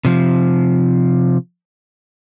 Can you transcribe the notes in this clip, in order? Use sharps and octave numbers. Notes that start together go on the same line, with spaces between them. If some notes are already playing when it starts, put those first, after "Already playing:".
C3 F3